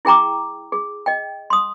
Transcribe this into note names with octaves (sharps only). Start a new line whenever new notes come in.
E4 G#4 G5 A#5 D6
G#4
D#5 G5
C6 D#6